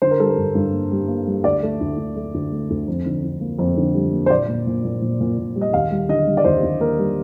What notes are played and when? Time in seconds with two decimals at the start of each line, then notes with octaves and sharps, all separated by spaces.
0.02 D3 C5
0.11 A#4
0.20 G3 A4
0.29 A#4
0.37 G2
0.55 G2
0.73 A#3
0.92 G3
1.08 A#3
1.27 G3
1.44 D2 D5
1.63 A3
1.80 D2
1.98 D2
2.16 A3
2.34 D2
2.52 A3
2.70 D2
2.88 F2
3.06 D3
3.23 D3
3.41 A#3
3.59 F2
3.77 D3
3.95 G3
4.13 A#3
4.26 C5
4.30 A#2 D5
4.48 A#2
4.67 A#2
4.84 A#2
5.02 A#2
5.20 A#2
5.38 A#2
5.56 G3
5.61 D#5
5.73 D#2 F5
5.91 G3
6.09 D3 D#5
6.27 G3
6.37 D5
6.44 D#2 C5
6.63 D#2
6.80 A#3 A#4
6.99 G3